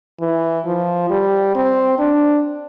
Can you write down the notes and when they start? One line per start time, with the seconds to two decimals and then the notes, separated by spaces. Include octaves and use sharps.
0.20 E3
0.66 F3
1.10 G3
1.55 C4
1.99 D4